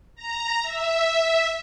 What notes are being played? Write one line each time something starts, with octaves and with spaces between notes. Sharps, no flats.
A#5
E5